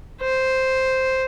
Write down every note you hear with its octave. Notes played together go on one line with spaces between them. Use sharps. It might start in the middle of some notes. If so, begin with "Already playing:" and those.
C5